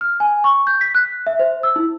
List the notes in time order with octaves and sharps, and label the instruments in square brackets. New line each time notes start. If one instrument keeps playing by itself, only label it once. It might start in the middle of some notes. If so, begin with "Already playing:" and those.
[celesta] F6
G#5
C#6
G6
B6
F#6
E5
C5
E6
E4